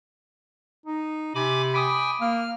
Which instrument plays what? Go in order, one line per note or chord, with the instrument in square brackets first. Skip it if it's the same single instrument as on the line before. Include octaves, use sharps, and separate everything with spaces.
[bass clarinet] D#4
[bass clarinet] C3 [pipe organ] G#5 B5 D6
[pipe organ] G5 G#5 [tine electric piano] B5 D6 D#6
[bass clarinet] A#3 [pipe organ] F6